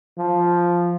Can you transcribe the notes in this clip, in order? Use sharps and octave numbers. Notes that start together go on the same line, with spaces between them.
F3